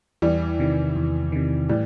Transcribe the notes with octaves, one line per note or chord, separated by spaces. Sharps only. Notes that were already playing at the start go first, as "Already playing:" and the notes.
E2 E3 G3
C3 D#3
E2
C3 D#3
A2 E3 G3